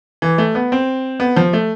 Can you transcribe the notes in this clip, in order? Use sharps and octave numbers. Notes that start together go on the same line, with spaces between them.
E3
A3
B3
C4
B3
F3
A3